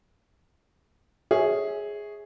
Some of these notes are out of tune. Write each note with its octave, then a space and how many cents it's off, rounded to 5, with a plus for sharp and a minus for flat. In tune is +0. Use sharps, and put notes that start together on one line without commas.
G#4 +0 C#5 +0 E5 -25